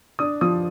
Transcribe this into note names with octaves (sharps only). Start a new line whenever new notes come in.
D4 D#6
F3 D#6